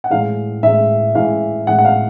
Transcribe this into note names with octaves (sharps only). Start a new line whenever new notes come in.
F#5
A2 E3 G#3 F5
A2 E3 G#3 E5
A2 E3 G#3 F5
A2 E3 G#3 F#5
F#5
F5